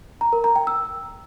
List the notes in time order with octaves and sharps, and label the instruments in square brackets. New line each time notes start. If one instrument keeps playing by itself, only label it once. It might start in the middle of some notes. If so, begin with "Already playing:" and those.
[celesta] A#5
A#4
A#5
G5
E6